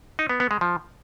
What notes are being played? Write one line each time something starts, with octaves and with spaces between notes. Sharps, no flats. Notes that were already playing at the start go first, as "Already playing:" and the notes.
D#4
B3
B3
G#3
F3